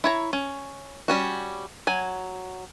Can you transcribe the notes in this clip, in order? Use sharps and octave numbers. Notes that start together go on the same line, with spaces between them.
E4 C#5 A#5
C#4
G3 C#4 F#4
F#3 G#5